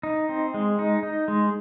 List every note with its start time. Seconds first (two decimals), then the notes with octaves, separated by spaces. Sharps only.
0.03 D#4
0.29 C4
0.54 G#3
0.79 D#4
1.03 D#4
1.28 G#3